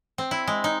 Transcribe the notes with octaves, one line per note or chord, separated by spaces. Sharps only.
C4
E4
G#3
D#4